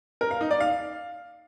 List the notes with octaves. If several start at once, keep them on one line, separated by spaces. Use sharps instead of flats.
A#4
F5
D#4
D5
F5